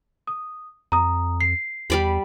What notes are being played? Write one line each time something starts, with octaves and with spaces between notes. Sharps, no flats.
D#6
F2 A#5 D#6
C7
E2 G3 D5 B5